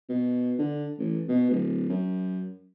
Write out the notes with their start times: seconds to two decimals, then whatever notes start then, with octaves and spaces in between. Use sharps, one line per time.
0.09 B2
0.59 D3
0.99 A1
1.29 B2
1.50 D1
1.89 F#2